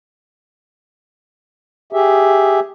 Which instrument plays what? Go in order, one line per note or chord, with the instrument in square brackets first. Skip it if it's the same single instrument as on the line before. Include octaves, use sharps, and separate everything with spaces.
[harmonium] G4 G#4 E5